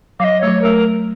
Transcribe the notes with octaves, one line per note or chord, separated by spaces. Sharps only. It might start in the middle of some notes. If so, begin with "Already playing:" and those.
F#3 D#5 F5
A3 C#5
F#3
A3 A#4